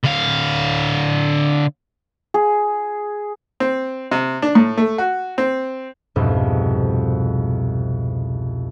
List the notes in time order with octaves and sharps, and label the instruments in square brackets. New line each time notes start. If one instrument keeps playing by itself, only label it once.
[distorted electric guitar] D3 F5
[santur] G#4
[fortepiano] C4
C3
D4
A2
A3
F#4
C4
[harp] C2 F2 G#2 B2